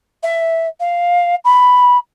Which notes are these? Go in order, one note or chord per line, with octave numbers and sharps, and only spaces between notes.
E5
F5
B5